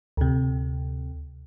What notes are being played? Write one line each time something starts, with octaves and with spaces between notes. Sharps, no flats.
D2 C3